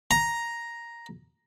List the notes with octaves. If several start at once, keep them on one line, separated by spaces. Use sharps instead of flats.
A#5